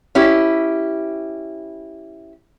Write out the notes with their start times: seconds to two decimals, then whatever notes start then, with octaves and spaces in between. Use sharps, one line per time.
0.15 C#4 E4 G4